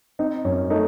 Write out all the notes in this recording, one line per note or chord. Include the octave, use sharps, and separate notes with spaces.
C4 D#4
F#2 C#4
A3 D#4